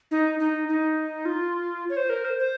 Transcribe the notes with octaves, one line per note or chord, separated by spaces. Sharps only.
D#4
D#4
D#4
F4
C#5
C5
A#4
C5
C5